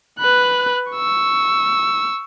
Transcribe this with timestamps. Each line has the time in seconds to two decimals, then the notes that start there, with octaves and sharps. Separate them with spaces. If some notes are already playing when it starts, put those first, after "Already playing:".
0.20 B4 F#6
0.92 C#6 E6